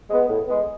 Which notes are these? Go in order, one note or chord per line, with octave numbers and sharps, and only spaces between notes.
G#3 B3
A2
G#3 B3